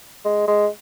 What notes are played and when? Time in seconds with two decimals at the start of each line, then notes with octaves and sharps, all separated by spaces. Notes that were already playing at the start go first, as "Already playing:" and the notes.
0.25 G#3
0.48 G#3